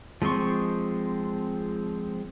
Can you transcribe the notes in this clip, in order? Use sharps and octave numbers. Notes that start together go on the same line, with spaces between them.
F3 G#3 C4 C6 C#6